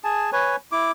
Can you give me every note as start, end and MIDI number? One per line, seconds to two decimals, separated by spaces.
0.04 0.30 68
0.04 0.30 80
0.04 0.30 81
0.33 0.56 71
0.33 0.56 73
0.33 0.56 80
0.72 0.92 64
0.72 0.92 86